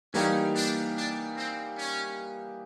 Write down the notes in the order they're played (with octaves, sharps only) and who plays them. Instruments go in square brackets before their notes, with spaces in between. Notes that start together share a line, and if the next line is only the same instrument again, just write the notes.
[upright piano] E3 G3 A#3 D#4 G4 [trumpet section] C#4
[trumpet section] D4
D4
C4
C#4